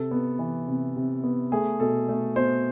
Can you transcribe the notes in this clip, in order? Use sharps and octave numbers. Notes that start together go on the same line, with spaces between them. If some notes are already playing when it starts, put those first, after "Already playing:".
Already playing: C3 A4
B3
E3
C3
C3
B3
A3 G#4
B2 A4
A3
B2 C5